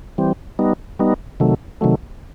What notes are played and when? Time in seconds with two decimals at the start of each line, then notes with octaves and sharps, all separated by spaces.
0.18 E3 G3 C4
0.59 G3 B3 D#4
0.99 G3 B3 D#4
1.40 C3 D#3 F#3 A3
1.81 C3 D#3 F#3 A3